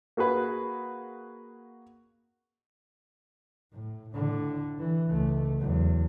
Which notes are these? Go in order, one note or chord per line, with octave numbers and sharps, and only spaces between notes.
A#3 F#4 G#4 B4
A2
A2 D3
E3
C#2 A3
E2 F#3